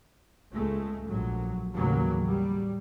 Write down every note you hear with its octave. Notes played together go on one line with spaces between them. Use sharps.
C#2 G#3 A3
A#1 F#3
A1 D#2 C#3 F#3 G3 A#3
G3